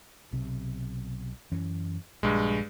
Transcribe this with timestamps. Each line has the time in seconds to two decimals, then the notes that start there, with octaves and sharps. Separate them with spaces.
0.33 B1 C3
1.52 F#2 E3 C#4
2.23 A#1 G2 G#3